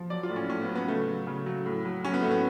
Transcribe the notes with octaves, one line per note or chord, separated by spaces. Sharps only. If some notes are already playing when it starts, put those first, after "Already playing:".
Already playing: F3
F#3 D5
F4
A2
C#4
A2 C#4
B3
F#3
B3
C#3 A3
F#3
C#3
F#3
A2
F#3
F#3 C#4
B3
A2 A3
B3